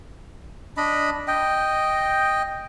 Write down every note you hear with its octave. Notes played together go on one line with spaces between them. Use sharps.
D4 D#5 B5
D#5 G5